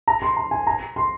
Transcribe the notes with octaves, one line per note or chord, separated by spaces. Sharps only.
A#5
C6
A#5
G#5
A#5
C6